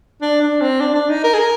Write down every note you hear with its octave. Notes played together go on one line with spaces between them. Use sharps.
D4
D4
C4
D4
D4
D#4
A#4
G#4
A#4